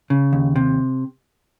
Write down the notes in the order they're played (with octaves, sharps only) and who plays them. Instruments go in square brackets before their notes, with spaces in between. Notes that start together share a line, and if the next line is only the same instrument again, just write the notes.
[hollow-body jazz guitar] C#3
D#2
C3